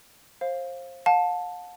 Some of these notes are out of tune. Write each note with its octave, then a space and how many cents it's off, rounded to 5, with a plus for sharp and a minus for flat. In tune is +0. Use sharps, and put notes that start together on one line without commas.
C5 +25 F5 +0
F5 +40 A5 +0